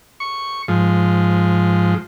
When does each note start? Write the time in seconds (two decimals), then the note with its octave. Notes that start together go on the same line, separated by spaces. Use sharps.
0.20 C#6
0.68 G#2 F3